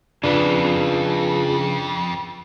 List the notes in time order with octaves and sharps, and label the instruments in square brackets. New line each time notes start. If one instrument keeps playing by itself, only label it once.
[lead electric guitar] F2 [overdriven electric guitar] C#3 B4 [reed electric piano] D4 [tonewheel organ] F4 G#4